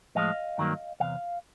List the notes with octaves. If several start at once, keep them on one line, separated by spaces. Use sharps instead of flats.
A2 F3 G#3 D#5 F5
G2 D#3 F#3 A#3
E2 C3 F5